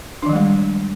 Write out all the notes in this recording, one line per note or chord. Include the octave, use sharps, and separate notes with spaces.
D#3 F3 G3 G#3 D4